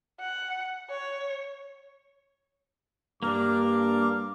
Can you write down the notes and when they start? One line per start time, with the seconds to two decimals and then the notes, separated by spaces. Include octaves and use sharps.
0.20 F#5
0.90 C#5
3.23 G2 A#3 D4 A#4 F5 D6